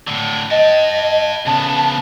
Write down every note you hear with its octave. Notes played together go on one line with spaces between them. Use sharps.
A2 D3
D#5 G5 A5
C#3 B3 A5